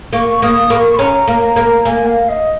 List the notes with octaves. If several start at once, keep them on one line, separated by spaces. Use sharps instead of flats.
A#3 C#6
A#3 D#6
A#3 C#6
C#4 A#5
A#3
A#5
A#3
A#3 G#5
F5
D#5